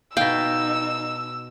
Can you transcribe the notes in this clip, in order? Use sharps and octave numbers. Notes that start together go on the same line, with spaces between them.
B2 D#4 F5 G5 E6